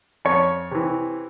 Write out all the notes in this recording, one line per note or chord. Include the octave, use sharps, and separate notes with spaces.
F2 C#5
C3 E3